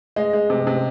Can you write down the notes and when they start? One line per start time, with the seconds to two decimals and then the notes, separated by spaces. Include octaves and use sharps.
0.16 G#3 D#5
0.33 G#3
0.50 C3
0.67 C3